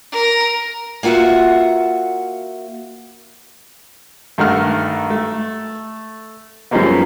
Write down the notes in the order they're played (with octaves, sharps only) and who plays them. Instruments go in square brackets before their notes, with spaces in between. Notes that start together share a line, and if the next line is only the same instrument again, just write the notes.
[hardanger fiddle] A#4
[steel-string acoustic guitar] A#3 F4 F#4 E5 F#5
[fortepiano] G2 D#3 A3 F#5 F6
A3
F#2 F3 G3 G#3 A#3 B3